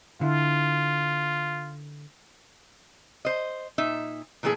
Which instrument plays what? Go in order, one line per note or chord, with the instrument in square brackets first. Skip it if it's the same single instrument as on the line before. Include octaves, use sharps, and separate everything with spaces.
[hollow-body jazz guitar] D3 E4 [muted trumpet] F4
[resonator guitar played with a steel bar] C5 D#5
A#2 D#4 E5
A#2 E3 A3 E4 G#4